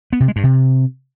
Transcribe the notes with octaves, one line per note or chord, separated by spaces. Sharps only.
B3
C3
G#3
G2
C3